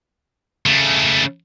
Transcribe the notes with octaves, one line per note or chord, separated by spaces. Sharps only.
C#3 A3